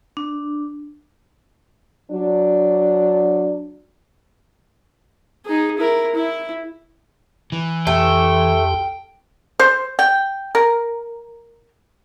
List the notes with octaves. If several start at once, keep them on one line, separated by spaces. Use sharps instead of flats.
D4
F#3 D4
D#4 G#4
E4 A#4
E4
E3
F2 A3 G4 G5
C5
G5
A#4